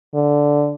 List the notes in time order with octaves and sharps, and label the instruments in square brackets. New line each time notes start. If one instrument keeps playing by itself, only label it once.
[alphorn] D3